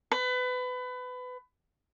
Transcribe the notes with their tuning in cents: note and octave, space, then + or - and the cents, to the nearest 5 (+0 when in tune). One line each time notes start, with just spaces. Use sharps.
B4 +25